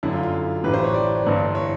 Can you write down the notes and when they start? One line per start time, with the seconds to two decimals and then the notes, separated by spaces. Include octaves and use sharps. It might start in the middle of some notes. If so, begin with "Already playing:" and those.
0.03 G1 F#2 D3 E4
0.13 F4
0.23 F4
0.64 A1 A2 E3 G3 B4
0.74 C5
0.84 C#5
0.94 D5
1.25 G1 G2 E3
1.55 C#5